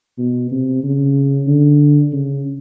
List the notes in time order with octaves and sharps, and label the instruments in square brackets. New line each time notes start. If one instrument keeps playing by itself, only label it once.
[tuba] B2
C3
C#3
D3
C#3